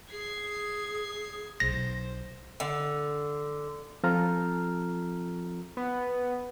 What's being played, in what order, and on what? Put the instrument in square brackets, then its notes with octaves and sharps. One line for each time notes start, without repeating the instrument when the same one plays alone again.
[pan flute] G#4 [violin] G#6 C7
[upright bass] B1 B2 [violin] C5 [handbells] A#6
[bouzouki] D3
[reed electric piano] F3 C4 F4 A4 A#5 F6
[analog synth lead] B3